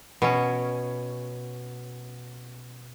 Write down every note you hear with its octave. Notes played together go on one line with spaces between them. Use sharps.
B2 C#4